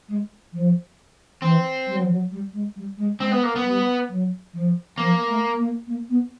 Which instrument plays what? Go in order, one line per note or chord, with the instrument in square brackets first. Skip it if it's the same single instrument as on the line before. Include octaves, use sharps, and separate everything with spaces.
[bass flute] G#3
F3
[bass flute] E3 [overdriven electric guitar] C4
[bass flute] G3
F#3
F3
F#3
G3
G#3
G3
G#3
[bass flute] G#3 [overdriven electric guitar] C4
[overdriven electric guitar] B3
A#3
B3
[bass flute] G3
F#3
F3
[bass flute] F3 [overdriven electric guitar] A#3
[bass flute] A3
A#3
A#3
B3